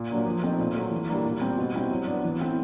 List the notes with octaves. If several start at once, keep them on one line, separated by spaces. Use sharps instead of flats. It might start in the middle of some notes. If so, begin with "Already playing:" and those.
Already playing: A#2
F#3 A#3 D4
F3
A3 C4 D#4
A#2
F#3 A3
E3
G3 A#3 D4
A#2
G3 C4
B2
G3 C4 E4
F#3
B3 D4
E3
A3 C4 E4